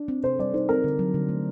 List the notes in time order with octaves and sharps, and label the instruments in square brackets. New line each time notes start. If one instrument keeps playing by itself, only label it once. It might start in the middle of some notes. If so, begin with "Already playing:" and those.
Already playing: [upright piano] D4
[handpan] C4
[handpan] C3 [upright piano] C5
[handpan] G3 [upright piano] D5
[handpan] D#4 [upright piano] C5
[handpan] C4 [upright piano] A#4
[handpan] D3
F#3
D3
A3